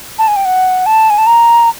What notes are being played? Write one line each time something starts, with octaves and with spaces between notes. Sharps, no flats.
A5
G#5
G5
F#5
A5
G#5
A5
A#5